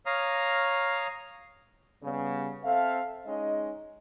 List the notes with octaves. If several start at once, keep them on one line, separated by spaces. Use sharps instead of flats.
C#5 F5 A#5 D#6 F6
C#3 G3 B3
C4 A4 E5 F5
G#3 C#4 D#4 D#5